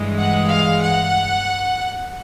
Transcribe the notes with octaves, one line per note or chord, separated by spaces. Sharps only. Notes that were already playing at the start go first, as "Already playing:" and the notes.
Already playing: G2 E3 G#3
F#5
F5
F#5